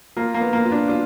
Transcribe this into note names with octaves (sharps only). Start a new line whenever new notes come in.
A#3 F4
A#3
B3
A#3
F4
D4
D4 F4